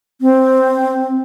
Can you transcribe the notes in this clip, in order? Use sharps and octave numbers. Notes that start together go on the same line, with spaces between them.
C4